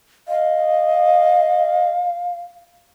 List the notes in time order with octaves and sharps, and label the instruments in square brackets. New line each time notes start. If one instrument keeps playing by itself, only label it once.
[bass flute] D#5 [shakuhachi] F5